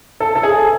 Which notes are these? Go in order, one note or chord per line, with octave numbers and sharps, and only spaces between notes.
A4
A4
G#4